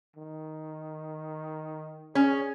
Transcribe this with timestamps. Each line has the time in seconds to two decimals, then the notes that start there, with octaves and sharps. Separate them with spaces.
0.16 D#3
2.15 C#4 G#4